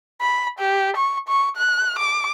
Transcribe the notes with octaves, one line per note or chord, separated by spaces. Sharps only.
B5
G4
C#6
C#6
F#6
D6